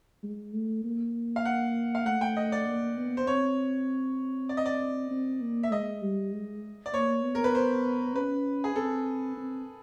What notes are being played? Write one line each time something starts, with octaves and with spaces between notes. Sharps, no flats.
G#3
A3
A#3
F5
F#5
F5
A3 F#5
G5
D#5
D5
A#3
B3
C5
C4 C#5
D5
D#5
D5
C4
A#3
E5
G#3 D#5
G3
G#3
D5
A#3 C#5
B3
A#4
B4
C5
C#4 B4
G#4
C4 A4
C4